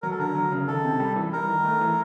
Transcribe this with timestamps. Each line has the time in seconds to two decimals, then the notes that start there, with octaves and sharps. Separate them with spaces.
0.03 F#3 A#4
0.11 A4
0.19 D3 A#4
0.35 F#3
0.52 C#3
0.67 D#3 A4
0.85 C3
1.00 G3
1.16 E3
1.32 G3 A#4
1.48 D#3
1.64 A3
1.81 E3